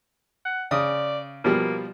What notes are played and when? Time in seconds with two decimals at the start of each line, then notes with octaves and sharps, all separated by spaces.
0.45 F#5
0.71 C#3 D5 D#6
1.45 B2 F3 G3 A#3